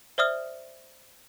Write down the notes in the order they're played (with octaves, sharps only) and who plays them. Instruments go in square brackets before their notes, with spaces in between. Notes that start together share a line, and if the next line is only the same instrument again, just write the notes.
[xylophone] C5 D5 E5 D#6 F6